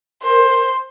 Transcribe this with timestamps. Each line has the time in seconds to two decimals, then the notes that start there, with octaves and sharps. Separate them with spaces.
0.24 A#4 C5
0.44 A#4